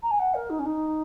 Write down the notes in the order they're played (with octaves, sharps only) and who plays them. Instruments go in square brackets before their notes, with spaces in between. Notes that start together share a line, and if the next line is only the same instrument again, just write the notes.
[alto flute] A#5
G#5
F#5
A#4
D#4
C#4
D#4